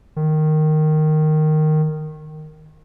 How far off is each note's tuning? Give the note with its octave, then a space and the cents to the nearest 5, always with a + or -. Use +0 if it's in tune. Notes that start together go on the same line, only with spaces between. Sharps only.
D#3 -10